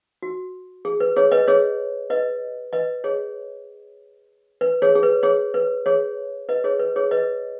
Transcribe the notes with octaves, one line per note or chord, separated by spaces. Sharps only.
F#4
G#4
B4
G#4 C#5
B4 D#5
G#4 C#5
B4 D#5
B4 D#5
G#4 C#5
B4
G#4 C#5
G#4
B4
G#4 C#5
B4
G#4 C#5
B4 D#5
G#4 C#5
B4
G#4 C#5
B4 D#5